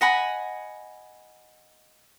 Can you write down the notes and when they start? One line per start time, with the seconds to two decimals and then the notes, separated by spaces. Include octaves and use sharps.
0.01 D#5 F#5 G#5 B5